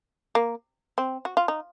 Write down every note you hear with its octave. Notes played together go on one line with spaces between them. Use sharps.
A#3
C4
F#4
F4
D#4